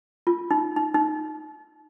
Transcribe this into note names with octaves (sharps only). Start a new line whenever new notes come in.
F4
D#4
D#4
D#4